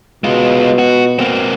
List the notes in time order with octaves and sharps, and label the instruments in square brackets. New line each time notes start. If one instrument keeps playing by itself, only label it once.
[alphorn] B2 [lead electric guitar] G#3 F4
[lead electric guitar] F#4
A#3 C4